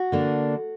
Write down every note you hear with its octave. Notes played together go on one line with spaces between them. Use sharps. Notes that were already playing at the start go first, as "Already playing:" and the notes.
Already playing: F#4
D3 A#3 D4